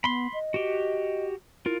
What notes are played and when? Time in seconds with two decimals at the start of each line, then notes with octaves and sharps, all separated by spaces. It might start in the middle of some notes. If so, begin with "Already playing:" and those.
0.04 B3 B5 C6
0.34 D#5
0.54 F#4 G4
1.66 E4 F4 A#4